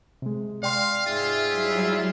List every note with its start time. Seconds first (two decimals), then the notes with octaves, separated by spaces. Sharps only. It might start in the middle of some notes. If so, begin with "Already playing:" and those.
0.22 C3 G#3
0.63 D5 F5 G5 C6
1.07 G#2 F4 G#4 E5
1.52 F#3 G3 E4